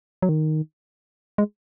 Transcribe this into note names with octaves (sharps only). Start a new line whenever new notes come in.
F#3
D#3
G#3